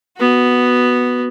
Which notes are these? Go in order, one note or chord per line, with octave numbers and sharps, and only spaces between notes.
B3 F#4